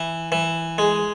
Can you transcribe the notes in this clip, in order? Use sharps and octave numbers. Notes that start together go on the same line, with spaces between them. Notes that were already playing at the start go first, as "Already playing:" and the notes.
Already playing: E3
E3
G#3